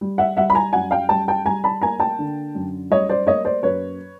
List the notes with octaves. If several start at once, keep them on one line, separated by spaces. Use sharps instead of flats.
G3
E5 F#5
G3 E5 F#5
B5
G#5 A#5
F#2 F#5 G#5
F5 G5
G3 G5 A5
G5 A5
G3 G#5 A#5
A5 B5
A#3 G#5 A#5
G5 A5
D3
F#2
G3 C#5 D#5
C5 D5
A#3 C#5 D#5
C5 D5
F#2 B4 C#5